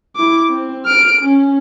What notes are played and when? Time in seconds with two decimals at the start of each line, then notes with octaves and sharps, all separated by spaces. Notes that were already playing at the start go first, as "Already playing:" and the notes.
0.16 E4 D6
0.50 C4
0.86 F6 D7
1.22 C#4